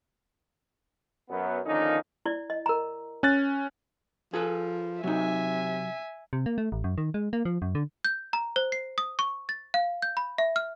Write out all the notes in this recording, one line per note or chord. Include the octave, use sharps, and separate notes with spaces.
F#2 B3
D3 D#3 F3 A#3 C#4 D#4
E4 D5
D#5
A#4 A#5
C#4 F#6 A6
F3 G#4 A4 B4
C3 F#3 D#4 E5 G#5
C3
A#3
A3
A1
F#2
D#3
G#3
A#3
F3
F#2
D3
G6
A#5
C5
C7
D#6
C#6
A6
F5
G6
B5
E5
F6